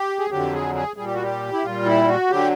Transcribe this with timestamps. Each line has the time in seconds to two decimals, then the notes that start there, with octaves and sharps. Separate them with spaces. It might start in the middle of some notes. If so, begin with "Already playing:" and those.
Already playing: G4
0.19 G#4
0.30 F2 D3 F#3 G4
0.53 G#4
0.75 G#4
0.96 A#2 G3 G#4
1.06 G4
1.14 F#4
1.23 G4
1.53 E4
1.63 A#2 G3 F4
1.86 E4
2.08 F#4
2.30 D3 F#3 G4